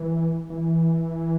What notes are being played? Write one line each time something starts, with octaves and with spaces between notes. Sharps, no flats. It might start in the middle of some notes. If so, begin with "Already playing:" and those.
Already playing: E3
E3